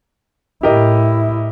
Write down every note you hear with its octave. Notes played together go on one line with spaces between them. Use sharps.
A2 E4 G4 A#4 D#5